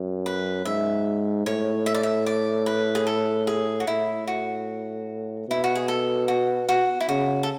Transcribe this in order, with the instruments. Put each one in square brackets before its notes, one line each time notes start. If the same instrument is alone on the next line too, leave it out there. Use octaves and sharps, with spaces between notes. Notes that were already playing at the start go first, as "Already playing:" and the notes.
Already playing: [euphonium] F#2
[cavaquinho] B4
[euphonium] G#2 [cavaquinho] E5
[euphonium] A2 [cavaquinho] C#5
[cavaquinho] E5
D5
E5
D5
B4
G#4
A4
G#4
F#4
[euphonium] A2 [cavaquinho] E4
[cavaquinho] F#4
[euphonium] B2 [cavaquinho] E4
[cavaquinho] F#4
G#4
A4
F#4
F#4
E4
[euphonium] C#3 [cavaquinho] F#4
[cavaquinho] A4